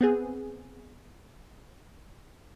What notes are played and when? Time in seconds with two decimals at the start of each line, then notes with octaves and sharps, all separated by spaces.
0.01 B3 C4 G#4